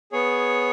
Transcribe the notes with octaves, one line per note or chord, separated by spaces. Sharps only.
B3 G#4 C#5